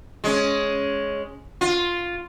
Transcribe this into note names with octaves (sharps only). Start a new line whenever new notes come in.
G#3 C#4
F4